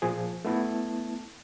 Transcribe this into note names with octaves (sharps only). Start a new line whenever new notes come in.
A#2 F3 G#4
A3 B3 E4 A5